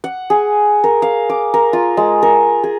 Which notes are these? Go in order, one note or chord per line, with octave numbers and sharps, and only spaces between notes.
F#5
G#4
A#4
F5
D6
A#4
F4
G#3
A#4
G#4